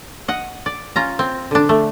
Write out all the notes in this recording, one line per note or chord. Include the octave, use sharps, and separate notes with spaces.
D#5 F#5
D5
C#4 F4 A#5
C4
D3 D4
A3